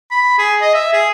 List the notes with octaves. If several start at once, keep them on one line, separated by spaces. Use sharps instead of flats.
B5
G#4
D#5
E5
G#4